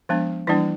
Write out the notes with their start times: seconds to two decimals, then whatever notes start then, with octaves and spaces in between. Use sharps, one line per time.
0.09 F3 G#3 B3 D4
0.47 E3 G3 A#3 D4 E4